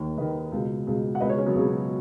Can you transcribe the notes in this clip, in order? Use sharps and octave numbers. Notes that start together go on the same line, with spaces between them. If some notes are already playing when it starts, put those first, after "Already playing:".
Already playing: D#2 D#3
D#2 D#3 B4 D#5
C#2 B2
C#2 B2
F#5
C#2 B2 B4 D#5
G#4 C#5
G#3 C#4
F#3 B3
C#2 B2 G#3